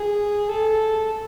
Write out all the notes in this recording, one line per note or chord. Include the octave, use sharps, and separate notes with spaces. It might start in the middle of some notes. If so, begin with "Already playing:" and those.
Already playing: G#4
A4